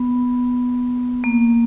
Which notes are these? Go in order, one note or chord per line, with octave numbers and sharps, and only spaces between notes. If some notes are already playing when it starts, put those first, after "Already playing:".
Already playing: B3
A#3